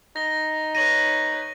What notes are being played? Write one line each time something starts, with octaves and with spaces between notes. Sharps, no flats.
D#4 A#6 G7
B4 C#5 A#6 D#7 F#7